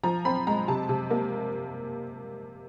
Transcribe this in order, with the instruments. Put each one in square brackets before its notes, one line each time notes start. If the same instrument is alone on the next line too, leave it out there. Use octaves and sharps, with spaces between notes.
[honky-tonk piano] F3 A#5
C4 B5
G#3 A#5
C3 A5
C3
A#3